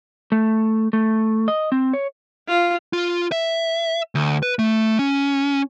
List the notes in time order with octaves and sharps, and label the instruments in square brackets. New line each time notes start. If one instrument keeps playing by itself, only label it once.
[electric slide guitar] A3
A3
D#5
C4
C#5
[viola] F4
[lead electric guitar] F4
E5
D2
B4
A3
C#4